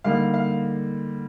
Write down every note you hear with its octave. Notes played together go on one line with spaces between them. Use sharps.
D3 G3 A#3 D#4 F5
F5